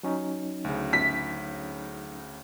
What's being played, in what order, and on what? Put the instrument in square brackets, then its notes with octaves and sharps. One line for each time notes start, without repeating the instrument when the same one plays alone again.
[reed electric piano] F#3 C#4 D#4
[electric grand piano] D2 C#3
[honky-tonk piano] B6